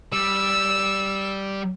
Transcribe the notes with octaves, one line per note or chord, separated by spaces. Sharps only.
G3 E6